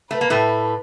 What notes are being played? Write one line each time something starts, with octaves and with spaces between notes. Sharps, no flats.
A3 B4
A#3
A2 A3